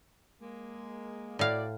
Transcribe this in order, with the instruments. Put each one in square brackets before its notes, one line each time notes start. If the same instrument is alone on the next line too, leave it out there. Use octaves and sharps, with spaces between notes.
[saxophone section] G#3 A#3
[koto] A2 F5 [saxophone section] E4 F#4 D5